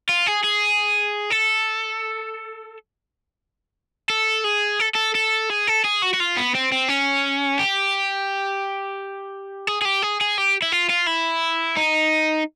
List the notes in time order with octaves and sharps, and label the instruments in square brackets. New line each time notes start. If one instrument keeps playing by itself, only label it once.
[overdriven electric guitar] F4
G#4
G#4
A4
A4
G#4
A4
A4
A4
G#4
A4
G#4
F#4
F#4
F4
B3
C4
C4
C#4
G4
G#4
G#4
G4
G#4
G#4
G4
E4
F4
F4
E4
D#4